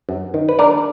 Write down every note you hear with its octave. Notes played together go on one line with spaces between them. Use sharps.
F#2
D#3
B4
D4 A#4 D5